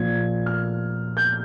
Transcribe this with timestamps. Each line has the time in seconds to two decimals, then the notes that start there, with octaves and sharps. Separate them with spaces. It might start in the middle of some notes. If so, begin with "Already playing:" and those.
Already playing: A#2 F3 G#6
0.46 F6
1.17 G6